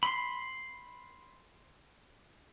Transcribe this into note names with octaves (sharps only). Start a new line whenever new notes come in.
B5 C6